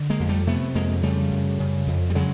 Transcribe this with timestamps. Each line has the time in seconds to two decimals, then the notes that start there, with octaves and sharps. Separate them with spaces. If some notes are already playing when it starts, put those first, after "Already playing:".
Already playing: D3
0.10 G#3 A#3
0.20 F2
0.29 G3 A3
0.47 C3 A3 B3
0.75 F2 G#3 A#3
1.03 C#3 G3 A3
1.31 F#2
1.59 C#3
1.87 F2
2.10 G3
2.15 C#3 F#3 G#3